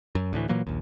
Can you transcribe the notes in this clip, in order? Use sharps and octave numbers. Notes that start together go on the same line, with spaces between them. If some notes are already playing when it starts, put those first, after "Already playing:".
F#2
D2 A2 E3
A#2 E3 F#3 A#3
A#1 D#2